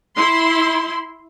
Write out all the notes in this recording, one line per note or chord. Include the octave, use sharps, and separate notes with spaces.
E4 C6